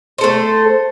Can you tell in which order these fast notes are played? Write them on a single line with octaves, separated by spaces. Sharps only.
C5 A4 A3